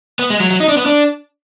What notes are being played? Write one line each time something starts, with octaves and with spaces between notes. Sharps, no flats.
B3
G#3
F#3
F#3
D#4
D4
B3
D4